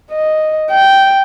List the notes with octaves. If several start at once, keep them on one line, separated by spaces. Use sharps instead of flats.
D#5
G5